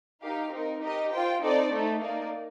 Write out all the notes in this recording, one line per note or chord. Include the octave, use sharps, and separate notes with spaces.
D#4 G4 A#4 F5
C4 D#4 A#4
D#4 G4 A#4 D#5
F4 C5 G5
C4 D#4 A4 D5
A3 D#4 A4
A#3 D#4 A#4 D5